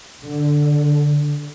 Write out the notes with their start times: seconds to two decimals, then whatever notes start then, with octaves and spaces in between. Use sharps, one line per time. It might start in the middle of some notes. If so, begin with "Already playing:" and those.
0.23 D3